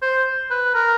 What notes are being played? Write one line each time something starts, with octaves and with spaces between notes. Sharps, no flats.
C5
B4
A#4